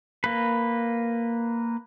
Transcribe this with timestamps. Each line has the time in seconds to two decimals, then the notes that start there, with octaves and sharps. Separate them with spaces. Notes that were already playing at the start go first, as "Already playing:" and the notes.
0.24 A#3 B4